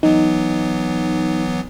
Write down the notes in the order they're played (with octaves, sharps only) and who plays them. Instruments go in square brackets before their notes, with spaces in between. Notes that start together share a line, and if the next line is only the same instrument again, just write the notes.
[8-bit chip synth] E3 F#3 B3 [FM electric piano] D#4